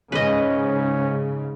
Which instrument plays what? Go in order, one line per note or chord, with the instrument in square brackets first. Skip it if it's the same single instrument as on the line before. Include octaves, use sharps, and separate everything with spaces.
[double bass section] G#2 C#3 [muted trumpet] C#4 [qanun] B4 D#5